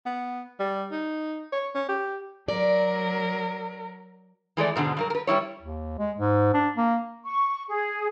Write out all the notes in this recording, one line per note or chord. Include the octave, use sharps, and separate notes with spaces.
B3
G3
D#4
C#5
C#4
G4
F#3 A#4 D5
E3 G#3 A3 D5
G#2 B2 D3 G#3
G2 F#3 A#4
A#4 B4
G3 G#3 E4 C#5
D#2
G#3
G#2
D4
A#3
C#6
G#4